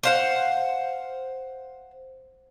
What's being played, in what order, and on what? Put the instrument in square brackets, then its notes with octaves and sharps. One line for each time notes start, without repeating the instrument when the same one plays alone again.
[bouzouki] C5 F5 F#5